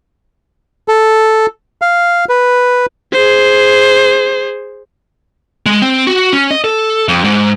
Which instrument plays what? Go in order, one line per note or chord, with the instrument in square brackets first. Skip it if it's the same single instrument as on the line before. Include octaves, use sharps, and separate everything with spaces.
[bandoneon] A4
F5
B4
[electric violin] G#4 C5
[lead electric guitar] G#3
C4
F#4
C#4
D#5
A4
F2
G#2